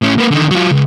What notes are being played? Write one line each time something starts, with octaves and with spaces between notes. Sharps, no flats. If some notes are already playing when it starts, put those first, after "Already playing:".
A2 C#4
A#3 B4
D3 D#3
F#3 F4
C#2